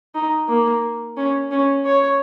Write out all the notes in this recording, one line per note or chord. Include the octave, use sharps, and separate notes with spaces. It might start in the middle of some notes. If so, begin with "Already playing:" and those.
D#4
A#3
C#4
C#4
C#5